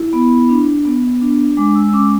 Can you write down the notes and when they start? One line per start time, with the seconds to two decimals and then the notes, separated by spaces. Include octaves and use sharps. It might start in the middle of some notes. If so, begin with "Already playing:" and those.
Already playing: E4
0.13 B3 B5
0.49 D4
0.85 B3
1.21 D4
1.57 G#3 D6
1.75 E6
1.88 E6
1.93 C#4 D6